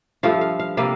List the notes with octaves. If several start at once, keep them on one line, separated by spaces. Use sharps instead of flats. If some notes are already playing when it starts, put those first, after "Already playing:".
G2 F3 A3 F5
F5
F5
C3 G3 A#3 F5